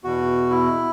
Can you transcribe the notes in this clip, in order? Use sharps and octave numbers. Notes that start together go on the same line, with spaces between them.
E2 B2 F#4
E4